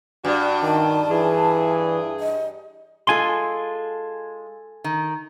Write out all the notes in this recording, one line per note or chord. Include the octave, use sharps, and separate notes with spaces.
G2 D4 F#4
D#3 A5
E3 G#4
D#5
G#3 F4 A4 G#5 C6
D#3